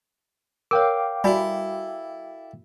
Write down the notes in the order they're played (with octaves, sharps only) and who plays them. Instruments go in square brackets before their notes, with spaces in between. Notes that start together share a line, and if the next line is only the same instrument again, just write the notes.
[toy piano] A#4 C#5 [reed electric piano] F5 G5 D6
[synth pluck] G3 [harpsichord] E4 A4 [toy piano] F#4 G#5 B5